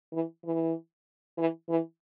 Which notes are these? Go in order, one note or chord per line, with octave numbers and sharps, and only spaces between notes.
E3
E3
E3
E3